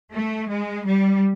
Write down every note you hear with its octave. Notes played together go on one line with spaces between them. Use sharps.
A3
G#3
G3